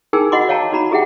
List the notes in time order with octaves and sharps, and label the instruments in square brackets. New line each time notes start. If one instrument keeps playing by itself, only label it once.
[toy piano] D#4 G#4 A#4 G5 G#5 E6
F#4 D#5 F#5 B5 C6 D6
C#5 F5 G5 A5 A#5
D#4 F#4 A#5 B5
F4 G4 G#4 E5 F#5 G5